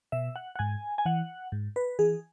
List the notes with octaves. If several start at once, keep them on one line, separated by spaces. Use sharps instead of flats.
B2 E5
F#5
F#5
G#2 G#5
G#5
E3 F#5
G#2
B4
E3 G#4